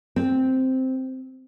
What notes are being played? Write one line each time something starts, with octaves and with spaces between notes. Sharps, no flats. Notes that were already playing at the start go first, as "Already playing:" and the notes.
C4